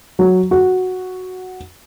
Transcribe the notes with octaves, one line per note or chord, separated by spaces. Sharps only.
F#3
F#4